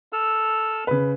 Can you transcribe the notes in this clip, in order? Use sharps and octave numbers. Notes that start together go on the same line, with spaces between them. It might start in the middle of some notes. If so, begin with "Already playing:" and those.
A4 E6 F6
C#3 B4